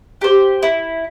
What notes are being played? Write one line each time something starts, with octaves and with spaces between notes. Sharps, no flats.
G4 C5
E4